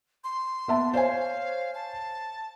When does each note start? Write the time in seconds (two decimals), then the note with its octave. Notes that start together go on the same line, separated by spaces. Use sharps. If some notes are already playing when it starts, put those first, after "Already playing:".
0.24 C6
0.68 B3 E5 A5
0.94 C5 C#5 F5 G#5
1.75 A5